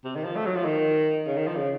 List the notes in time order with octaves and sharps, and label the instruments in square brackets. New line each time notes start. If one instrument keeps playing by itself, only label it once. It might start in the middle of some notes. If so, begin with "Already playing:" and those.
[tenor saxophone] C3
D#3
F3
A3
F#3
F3
D#3
C#3
D#3
F3
C#3